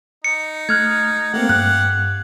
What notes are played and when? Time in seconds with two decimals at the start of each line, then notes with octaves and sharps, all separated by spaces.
0.24 D#4 C#7
0.69 A3 F6 F#6 G#6
1.34 A3 A#3 C4 G4 F5 F#5
1.49 G2 F#6